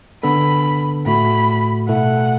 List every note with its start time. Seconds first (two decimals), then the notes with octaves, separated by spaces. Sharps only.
0.23 D3 B3 D4 A4 B5
1.06 A2 A3 F#4 B5
1.89 B2 A3 E4 A4 F#5